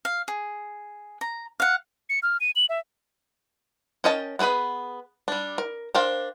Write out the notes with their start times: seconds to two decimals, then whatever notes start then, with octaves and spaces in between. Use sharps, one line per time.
0.05 F5
0.28 G#4
1.21 A#5
1.60 F5 F#5
2.09 C#7
2.23 F6
2.41 D#7
2.56 F#7
2.69 E5
4.04 C#4 A#4 D#5 G5 A5
4.39 B3 C4 G#4 B4 B5
5.28 G3 D4
5.58 A#4
5.95 D4 A#4 C5 F5 G5